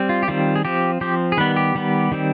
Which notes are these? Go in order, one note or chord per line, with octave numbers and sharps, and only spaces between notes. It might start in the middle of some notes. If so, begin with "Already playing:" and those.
Already playing: G3 C4
F4
G4
D#3 G3 C4 F4
G#4
F3 C4 G4
F3 C4 G4
G#4
D#3 G3 B3 B4
G4
D#3 G3 B3
D#3 G3 C4